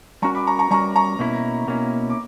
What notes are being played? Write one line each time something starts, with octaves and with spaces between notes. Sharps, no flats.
G3 C#4 F#4 A#4 A#5 C#6
B5 D6
A#5 C#6
A#5 C#6
G3 C#4 F#4 A#4 A#5 C#6
A#5 C#6
B2 A#3 C#4 E4
B2 A#3 C#4 E4
D6